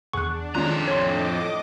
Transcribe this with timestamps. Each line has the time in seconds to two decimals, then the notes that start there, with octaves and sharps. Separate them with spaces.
0.13 E2 D4 G#4 F#5 C#6 F#6
0.55 F2 D#3 G#3 C#4 F4 A#5 F#6
0.88 A2 C#5 D#5 C6 D6